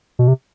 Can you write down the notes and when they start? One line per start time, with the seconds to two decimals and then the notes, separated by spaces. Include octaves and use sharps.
0.19 B2
0.28 C3